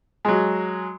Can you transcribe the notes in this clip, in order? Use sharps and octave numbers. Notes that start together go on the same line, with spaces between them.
F#3 G#3